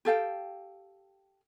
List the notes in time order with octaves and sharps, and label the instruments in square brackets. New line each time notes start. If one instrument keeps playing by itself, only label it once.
[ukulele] G4 A4 F5 G5